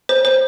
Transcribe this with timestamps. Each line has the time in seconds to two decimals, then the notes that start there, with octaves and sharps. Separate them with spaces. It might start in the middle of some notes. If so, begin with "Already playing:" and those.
0.09 C5
0.25 C5